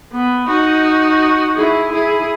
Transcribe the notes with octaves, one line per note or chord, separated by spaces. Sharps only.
B3
D#4 F#4
E4 G#4
E4 G#4